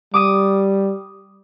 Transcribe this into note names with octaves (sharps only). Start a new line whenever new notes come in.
G3 D6 D#6 D#7